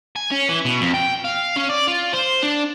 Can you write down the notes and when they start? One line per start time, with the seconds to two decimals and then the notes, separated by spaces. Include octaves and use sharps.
0.16 G#5
0.31 C#4
0.49 E3
0.65 B2
0.81 F2
0.94 G5
1.25 F5
1.57 C#4
1.70 D5
1.88 F4
2.13 C5
2.43 D4